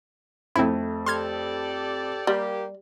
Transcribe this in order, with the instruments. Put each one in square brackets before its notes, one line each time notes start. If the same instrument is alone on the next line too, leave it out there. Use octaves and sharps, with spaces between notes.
[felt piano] F2 A3 [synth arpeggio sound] C4 E4
[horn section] G4 A4 D5 [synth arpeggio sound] C6 F6 G#6
[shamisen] G3 [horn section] A#3 G4